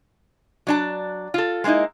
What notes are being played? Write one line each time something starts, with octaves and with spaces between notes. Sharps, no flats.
F#3 D4 A5
F4 A4
G#3 A#3 C4 D#4 E4